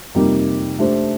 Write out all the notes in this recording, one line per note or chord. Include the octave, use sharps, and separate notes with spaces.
F2 C3 G3 A#3 D#4
A3 D4 G4 C5